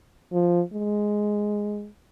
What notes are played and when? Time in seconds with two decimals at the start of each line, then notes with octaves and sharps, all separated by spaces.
0.32 F3
0.73 G#3